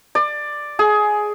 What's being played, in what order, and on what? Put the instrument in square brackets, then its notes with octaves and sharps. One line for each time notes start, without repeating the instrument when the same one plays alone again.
[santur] D5
G#4